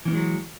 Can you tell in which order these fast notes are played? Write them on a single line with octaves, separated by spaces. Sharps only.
E3 C#4 B3 G#3 F#3